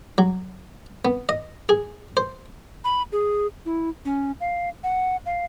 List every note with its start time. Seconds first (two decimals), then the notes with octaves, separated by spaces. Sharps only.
0.18 F#3
1.05 B3
1.29 D#5
1.69 G#4
2.17 C5
2.84 B5
3.12 G#4
3.66 E4
4.05 C#4
4.41 F5
4.84 F#5
5.26 F5